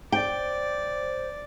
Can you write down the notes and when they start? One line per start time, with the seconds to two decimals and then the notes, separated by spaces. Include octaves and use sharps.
0.12 C5 D5 G5